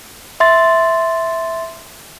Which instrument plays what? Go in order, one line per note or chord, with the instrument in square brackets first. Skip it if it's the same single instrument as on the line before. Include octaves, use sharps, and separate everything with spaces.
[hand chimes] E5 C6 A6